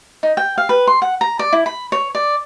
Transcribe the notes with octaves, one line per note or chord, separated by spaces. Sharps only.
D#4
G5
F5
B4
C6
F#5
A#5
D5
E4
B5
C#5
D5